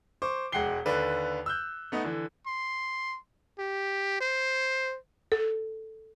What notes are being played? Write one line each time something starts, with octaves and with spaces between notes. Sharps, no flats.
C5 C#6 D6
E1 G#3 F#5 G5 C7 G7
D#2 D3 B4 D5
E6 F#6 G6
A3 B3 D#4
D3 E3
C6
G4
C5
A4